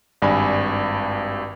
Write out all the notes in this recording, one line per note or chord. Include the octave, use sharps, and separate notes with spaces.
G#1 G2 D5 G#5 B5